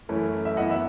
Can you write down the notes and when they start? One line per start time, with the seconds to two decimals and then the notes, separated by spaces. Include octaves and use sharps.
0.09 F#2 E3 A3 C#4
0.45 E5
0.57 F#2 E3 B3 D#5 F#5
0.71 E5